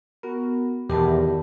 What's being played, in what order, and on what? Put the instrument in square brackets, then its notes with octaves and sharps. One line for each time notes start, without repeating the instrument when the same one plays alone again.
[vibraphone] B3 [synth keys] F#4 A#4
[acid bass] E2 [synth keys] B2 D#3 B5 [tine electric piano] G4 [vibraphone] A#4 A5